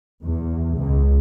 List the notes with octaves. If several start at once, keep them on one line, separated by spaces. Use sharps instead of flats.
E2
C#2